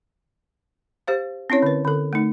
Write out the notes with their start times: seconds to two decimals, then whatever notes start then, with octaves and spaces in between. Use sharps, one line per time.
1.07 G4 C5 F5
1.50 C4 C#4 E4 C#5
1.62 D3 B4
1.85 D3 A4
2.13 A3 D#4